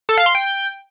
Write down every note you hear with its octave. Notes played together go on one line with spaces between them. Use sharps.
A4
F5
C6
G5